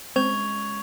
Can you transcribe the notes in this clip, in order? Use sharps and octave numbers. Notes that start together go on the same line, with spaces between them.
G#3 C4 C#4 C#6 G#6 F7